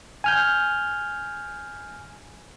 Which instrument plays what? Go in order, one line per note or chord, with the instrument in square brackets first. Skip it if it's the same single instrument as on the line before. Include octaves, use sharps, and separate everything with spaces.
[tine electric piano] G#5 F6 G6